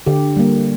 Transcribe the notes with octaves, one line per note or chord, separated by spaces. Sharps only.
D3 G4
G3 A#3